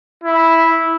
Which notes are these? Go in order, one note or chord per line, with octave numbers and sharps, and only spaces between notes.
E4